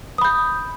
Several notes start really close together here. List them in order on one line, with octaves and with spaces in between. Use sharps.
D#6 B5 G6